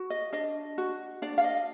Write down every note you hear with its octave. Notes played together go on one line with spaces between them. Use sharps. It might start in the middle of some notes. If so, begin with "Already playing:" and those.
Already playing: F#4
D#5
D4 D#5
F#4
D4 D5
F5
D#5